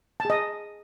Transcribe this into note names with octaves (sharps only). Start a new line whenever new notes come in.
G#4 D#5 A5